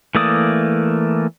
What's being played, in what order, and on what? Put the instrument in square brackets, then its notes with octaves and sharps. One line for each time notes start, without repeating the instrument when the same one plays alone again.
[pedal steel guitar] E3 A3 A#3 D5 D#6